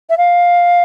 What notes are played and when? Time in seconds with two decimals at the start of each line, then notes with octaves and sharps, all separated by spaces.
0.10 E5
0.18 F5